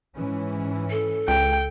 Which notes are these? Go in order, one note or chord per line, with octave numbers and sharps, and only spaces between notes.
G#2 E3 C#4
A4
C#2 G5